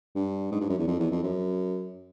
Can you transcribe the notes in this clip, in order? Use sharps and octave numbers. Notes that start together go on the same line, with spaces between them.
G2
G#2
G2
F#2
E2
F2
E2
F2
F#2